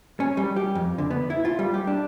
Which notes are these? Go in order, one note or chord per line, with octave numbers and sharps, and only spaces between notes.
C#4
G3
G4
F2
D3
B3
E4
F4
G3
G4
D4